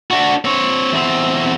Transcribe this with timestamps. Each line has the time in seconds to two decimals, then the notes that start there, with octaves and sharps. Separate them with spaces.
0.11 D4 F#4
0.45 C4 C#5
0.92 E2 C4